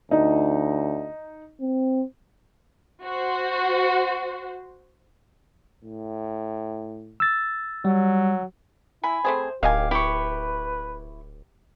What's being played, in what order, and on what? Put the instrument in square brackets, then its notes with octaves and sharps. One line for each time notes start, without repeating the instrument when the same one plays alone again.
[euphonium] D2 [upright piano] D#4
[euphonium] C4
[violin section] F#4 C5
[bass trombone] A2
[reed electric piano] E6 A6
[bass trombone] F#3 [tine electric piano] G3
[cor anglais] E4 [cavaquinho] G#5 B5
[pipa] A3 C4 G#4 [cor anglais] C5
[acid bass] D1 [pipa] D#3 D#5 G#5 [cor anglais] G4 [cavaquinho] F5
[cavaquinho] E4 C#6 [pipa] G4 [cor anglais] B4